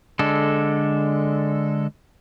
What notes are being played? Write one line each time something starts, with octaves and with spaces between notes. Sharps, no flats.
D3 G#3 A4